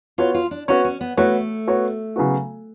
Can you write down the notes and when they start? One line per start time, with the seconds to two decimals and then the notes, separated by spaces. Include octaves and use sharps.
0.18 B3 F4 F#4 C#5
0.34 F4
0.51 D4
0.68 B3 C#4 F#4 C#5
0.85 C#4
1.01 B3
1.17 A3 B3 F#4 C#5
1.67 B3 F#4 C#5
2.16 C#3 F#3 B3 F#4